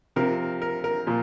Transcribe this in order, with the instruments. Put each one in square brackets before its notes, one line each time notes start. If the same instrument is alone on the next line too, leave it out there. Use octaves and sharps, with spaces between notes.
[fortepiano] C3 F3 C4 A#4
A#4
A#4
A#2 F3